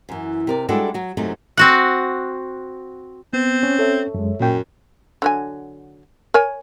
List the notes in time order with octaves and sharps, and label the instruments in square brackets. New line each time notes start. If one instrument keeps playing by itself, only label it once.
[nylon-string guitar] F#2 E3
C3 A#4 D5
G3 G#3 D4 E4 F#4 A4
F#3 F#4
F#2 C3 F#3 A3 D#4
[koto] C4 F#4 F#5
[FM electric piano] B3 [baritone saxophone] C4
[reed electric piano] C#4
[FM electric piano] A4 C#5 E5
[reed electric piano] F#2 G#3
[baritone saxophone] F#2 [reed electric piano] A#2 G5
[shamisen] D3 F#3 G#5
A#4 C#5 G#5